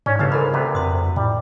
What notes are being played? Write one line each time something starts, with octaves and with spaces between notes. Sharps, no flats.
G#2 C#4 D4 C#5 D5
G1 C#3 F5 A5
G#2 A4 A#4 B5
D2 C3 B4
F2 C6 D#6
A2 G3